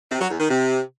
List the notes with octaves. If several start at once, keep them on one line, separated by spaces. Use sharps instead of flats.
C3
F#3
E2
D#3
C3